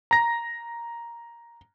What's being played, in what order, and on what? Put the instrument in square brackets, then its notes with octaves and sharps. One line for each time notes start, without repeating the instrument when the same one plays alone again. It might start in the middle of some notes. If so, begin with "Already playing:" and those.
[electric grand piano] A#5 A#6